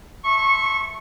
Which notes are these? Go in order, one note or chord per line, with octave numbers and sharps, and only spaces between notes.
E5 A5 C6 C#6